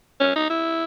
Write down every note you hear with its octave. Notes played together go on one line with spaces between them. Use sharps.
C#4
D#4
E4